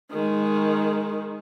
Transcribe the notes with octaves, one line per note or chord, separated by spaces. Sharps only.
D#3 G#3